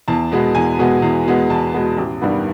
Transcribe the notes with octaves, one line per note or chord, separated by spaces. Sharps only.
E2 A5
B2 G#3 B3
E2 G#5
B2 G#3 B3
E2
B2 G#3 B3
E2 A5
B2 G#3 B3
A1
G2 D#3 G3 B3